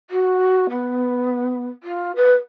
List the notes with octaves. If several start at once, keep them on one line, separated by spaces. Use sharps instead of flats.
F#4
B3
F4
B4